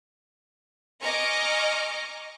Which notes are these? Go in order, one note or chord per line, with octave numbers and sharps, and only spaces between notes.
D#5 G#5 A#5 C#6 D6 F6